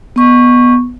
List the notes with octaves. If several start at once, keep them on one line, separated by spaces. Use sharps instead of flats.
B3 C#6